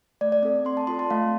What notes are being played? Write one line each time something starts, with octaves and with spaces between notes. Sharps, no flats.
A3 D5
D5
C4 A4 D5
C4 C6
A5
F4 A4 C6
A5
A3 F5